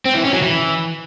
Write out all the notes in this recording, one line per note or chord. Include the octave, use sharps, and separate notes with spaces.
C4
E3
C#4
F#3
E3